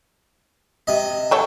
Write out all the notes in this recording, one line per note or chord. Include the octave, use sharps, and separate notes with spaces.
C3 D#5
F#3 A4 C#5